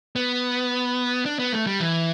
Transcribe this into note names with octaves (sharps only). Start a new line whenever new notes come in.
B3
D4
B3
A3
G3
E3